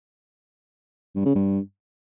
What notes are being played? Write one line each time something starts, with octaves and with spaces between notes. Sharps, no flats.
G2
C#3
G2